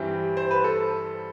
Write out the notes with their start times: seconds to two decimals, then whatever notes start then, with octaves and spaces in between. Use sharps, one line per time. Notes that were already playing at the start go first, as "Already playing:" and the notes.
Already playing: G2 E3 G3 C4 G4
0.37 C5
0.51 B4
0.64 A4